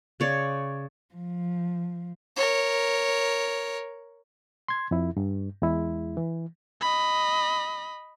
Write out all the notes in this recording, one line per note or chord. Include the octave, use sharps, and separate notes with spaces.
C#3 C#5 D5
F3
A#4 C#5
C6 G#6
F2 E4
G2
E2 G#3 E4
E3
D#5 B5